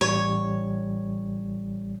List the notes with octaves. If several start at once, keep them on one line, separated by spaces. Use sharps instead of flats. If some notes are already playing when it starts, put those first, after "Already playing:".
A1 G3 C#5